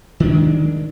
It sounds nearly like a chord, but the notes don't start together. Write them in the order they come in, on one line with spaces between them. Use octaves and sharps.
D#3 D4 G#3